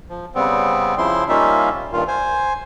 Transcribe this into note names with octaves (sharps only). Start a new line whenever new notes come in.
F3
C#3 G3 B3 C4
C#3 F3 E4 C6
G3 A#3 C#4 D#4 F4 E5
G2 A#2 D#3 F4
C5 G#5